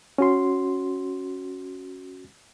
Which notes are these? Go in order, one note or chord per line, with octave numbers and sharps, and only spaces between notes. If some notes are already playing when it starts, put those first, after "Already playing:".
C#4 F#4 C6